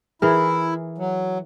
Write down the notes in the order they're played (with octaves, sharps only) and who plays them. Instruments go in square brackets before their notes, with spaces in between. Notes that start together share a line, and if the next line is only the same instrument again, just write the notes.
[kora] E3 G#4 A#4 [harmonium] E4
[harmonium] F#3